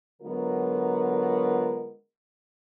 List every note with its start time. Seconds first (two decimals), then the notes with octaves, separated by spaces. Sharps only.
0.22 D3 F#3 G#3 B3 F4 A#4